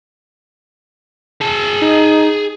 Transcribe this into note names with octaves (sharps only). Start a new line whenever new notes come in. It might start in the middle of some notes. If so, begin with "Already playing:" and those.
G#4 A5
D#4